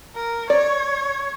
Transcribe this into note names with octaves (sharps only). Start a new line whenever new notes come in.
A#4
C#5 D5